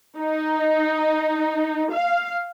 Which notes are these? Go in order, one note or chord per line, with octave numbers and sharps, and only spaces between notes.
D#4
F5